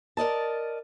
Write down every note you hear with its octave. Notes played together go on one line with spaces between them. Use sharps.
A#4 D5 D#5 A5